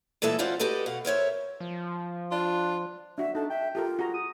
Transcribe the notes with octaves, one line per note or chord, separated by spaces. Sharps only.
A#2 E3 G#3 A4 E5 A5
C#4 F4 F#4 C5 D5
F#4 G4 A4 B4 D#5
B2 F5 F#5
A#4 C5 C#5 E5
F3
D4 F4
D4 F#4 E5
D4 D#4 A4
E5 G5
F4 G4 A4 A#4
F#4 G#4 A#5
D#6